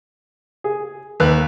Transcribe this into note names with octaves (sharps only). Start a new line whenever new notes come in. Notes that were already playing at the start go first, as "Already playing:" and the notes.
G#4
D#2 B4 F#6